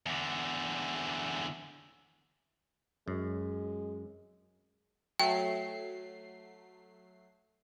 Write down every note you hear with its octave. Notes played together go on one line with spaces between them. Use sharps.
E2 D3
F#2 G#3
F#3 A3 G5 C7